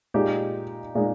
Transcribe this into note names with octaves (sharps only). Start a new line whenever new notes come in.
A#2 G#3 D#4 G4
A#2 G#3 D#4